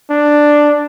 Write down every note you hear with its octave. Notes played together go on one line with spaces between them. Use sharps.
D4